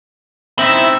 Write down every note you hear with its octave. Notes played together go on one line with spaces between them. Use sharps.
C4 D#4 E4 E5